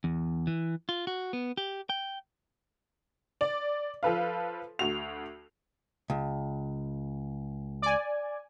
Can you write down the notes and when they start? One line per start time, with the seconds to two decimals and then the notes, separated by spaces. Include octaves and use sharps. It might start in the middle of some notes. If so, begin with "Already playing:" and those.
0.04 E2
0.47 E3
0.89 F4
1.07 F#4
1.33 B3
1.57 G4
1.90 G5
3.41 D5
4.03 F3 A4 B4 F5
4.79 D2 F#4 F7
6.10 C#2
7.82 D5 G#5